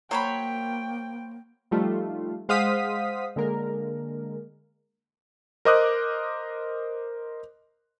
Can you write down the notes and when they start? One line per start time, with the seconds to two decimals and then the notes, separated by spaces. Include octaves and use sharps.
0.11 F#3 A#3 C5 C#5 G5 B5
1.71 F3 G3 A3 D#4 F4
2.49 G#3 C5 F5 F#5 D#6 B6
3.36 D3 G#3 A#3 A#4
5.65 A#4 C5 D#5 D6 D#6 F#6